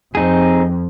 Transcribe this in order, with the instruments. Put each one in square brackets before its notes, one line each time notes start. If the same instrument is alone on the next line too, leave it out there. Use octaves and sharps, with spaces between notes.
[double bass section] F2 [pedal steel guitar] C4 D#4 G#4